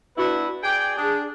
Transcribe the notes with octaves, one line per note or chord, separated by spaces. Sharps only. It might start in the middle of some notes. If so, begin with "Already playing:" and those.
B3 D4 E4 F#4 B4
G#4 D5 G5
D4 G#4